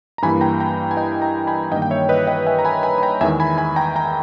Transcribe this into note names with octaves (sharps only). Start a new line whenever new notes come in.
A#5
G2 E3 A#3 G#5 B5
G5 A#5
G5 A#5
G#5
D#5 G5
G5 A#5
G#5 B5
G2 D#3 A#3 D#5 G5
G5
C#5 E5
B4 D#5
D#5 G5
E5 G#5
A#5
G#5 B5
G#5 B5
B5
G5 A#5
E2 D#3 G#3 E5 G#5
G#5 B5
G#5 B5
G5 A#5
G5 A#5